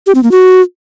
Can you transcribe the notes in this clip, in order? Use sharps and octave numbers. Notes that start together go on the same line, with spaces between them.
G4
C4
A#3
F#4